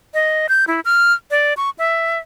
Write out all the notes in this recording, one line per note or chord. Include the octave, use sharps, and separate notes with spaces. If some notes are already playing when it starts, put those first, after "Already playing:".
D#5
G6
E4
F6
D5
C#6
E5